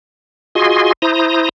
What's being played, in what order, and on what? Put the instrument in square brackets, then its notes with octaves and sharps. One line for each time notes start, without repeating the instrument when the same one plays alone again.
[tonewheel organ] F4 F#4 G#4 D#5 G#5 C6
E4 C5 A#5 D#6